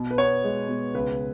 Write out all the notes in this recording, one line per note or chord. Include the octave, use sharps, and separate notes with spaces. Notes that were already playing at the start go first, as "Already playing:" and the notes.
Already playing: B2
B4
B3 C#5
G#3
B2
C#2 B4